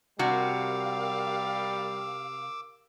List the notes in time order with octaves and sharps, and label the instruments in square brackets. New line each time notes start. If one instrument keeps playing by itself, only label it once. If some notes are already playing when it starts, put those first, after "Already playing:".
[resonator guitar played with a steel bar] C3 F#4 [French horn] G3 [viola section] G4 A#4 F5 [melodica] D6 E6